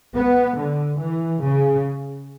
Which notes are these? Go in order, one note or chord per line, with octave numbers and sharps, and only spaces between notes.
B3
D3
E3
C#3